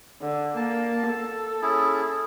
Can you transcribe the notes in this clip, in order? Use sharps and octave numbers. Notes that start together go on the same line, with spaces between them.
D3
A#3 A5
A4
C#4 E4 G#4